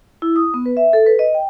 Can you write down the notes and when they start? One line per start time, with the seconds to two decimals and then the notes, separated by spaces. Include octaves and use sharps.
0.22 E4
0.36 D#6
0.54 B3
0.66 B4
0.77 E5
0.93 A4
1.06 B4
1.19 D#5
1.34 G5